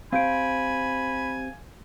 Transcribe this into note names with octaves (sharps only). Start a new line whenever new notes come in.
C4 G4 C5 F5 G#5 B5 G6 D7